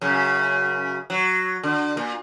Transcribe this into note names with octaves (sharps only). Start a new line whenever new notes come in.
F#2 C#3
F#3
D3
A#2